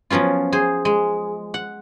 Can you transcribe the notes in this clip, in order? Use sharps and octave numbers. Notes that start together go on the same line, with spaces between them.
F3 F#3 B3 C#4 F4
G#4 C5
G#3
F#5